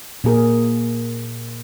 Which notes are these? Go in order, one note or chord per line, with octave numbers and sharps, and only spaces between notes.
A#2 A#3 G#4 A#4